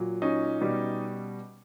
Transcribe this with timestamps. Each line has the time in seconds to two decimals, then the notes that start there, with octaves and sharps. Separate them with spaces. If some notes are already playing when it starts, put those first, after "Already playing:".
Already playing: A#2 F#3
0.22 C#4 D#4
0.61 B2 G3